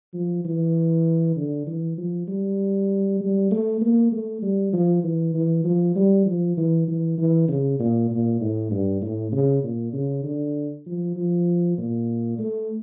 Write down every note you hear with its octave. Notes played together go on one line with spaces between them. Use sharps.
F3
E3
D3
E3
F3
G3
G3
A3
A#3
A3
G3
F3
E3
E3
F3
G3
F3
E3
E3
E3
C#3
A#2
A#2
A2
G2
A2
C#3
A#2
C#3
D3
F3
F3
A#2
A3